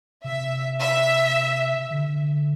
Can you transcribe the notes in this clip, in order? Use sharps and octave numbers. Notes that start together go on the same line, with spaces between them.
C3 E5
E5
D3